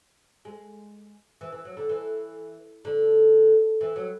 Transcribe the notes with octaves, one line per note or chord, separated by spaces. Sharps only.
G#3
E3
E3
F#3
D3
E3
D3
E3
F#3